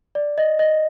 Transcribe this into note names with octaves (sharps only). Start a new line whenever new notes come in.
D5
D#5
D#5